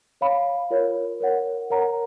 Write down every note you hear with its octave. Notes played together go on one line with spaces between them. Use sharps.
C#5 F5 B5
F4 A#4 C#5
A#4 C#5 F#5
A#4 C#5 F#5 A#5